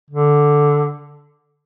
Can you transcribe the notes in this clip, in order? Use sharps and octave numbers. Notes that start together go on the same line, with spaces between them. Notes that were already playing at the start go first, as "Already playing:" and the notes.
D3